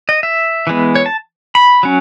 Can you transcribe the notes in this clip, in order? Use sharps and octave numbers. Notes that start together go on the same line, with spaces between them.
D#5
E5
E3 G#3 B3
C#5
A5
B5
F#3 C#4